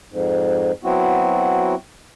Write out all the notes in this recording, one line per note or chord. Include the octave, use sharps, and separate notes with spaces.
F2 G#2
F#3 B3 C4 E4 F#4